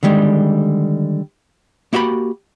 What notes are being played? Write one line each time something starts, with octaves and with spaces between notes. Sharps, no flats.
D3 D#3 G3 G#3
A#3 E4 F#4 G4 B5